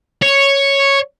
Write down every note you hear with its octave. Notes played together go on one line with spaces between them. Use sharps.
C#5